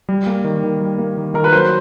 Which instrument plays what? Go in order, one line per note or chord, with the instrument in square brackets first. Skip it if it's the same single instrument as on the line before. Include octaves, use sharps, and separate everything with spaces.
[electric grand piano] G3
A#3
D#3
D#3
G3
A#3
D#3
[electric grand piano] D#3 [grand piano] A#4
[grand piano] B4
[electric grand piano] F#3 [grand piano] C5